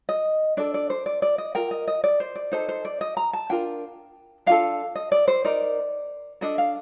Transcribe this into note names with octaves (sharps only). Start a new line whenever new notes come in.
D#5
D4 A4 D5
D5
C5
D5
D5
D#5
F4 A#4 G5
D#5
D#5
D5
C5
D5
D#4 A4 C5
C5
D5
D#5
A#5
A5
D4 F4 A#4 G5
D4 F4 A4 F5
D#5
D5
C5
D#4 A#4 D5
D4 A4 D#5
F5